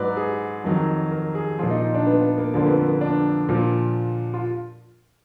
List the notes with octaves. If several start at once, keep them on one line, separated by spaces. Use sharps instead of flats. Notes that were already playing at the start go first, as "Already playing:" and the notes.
Already playing: G#2 F#3 B4 D5
G#4
F2 D#3 F#3
A#4
G#4
A#2 F3 F4
D#4
D4
B3
B3
A#3
F2 D3 F3 A#3
B3
A#3
B3
D4
A#2 F3
F4